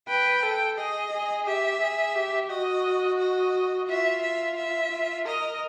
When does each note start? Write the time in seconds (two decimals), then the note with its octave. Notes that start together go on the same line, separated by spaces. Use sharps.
0.08 B4 G5
0.43 A4
0.77 G#4 D#5
1.12 G#4
1.46 G4 E5
1.81 G#4
2.16 G4
2.50 F#4 D#5
3.19 D#5
3.88 F4 E5
4.22 E5
4.57 E5
4.92 F4
5.26 A#4 D#5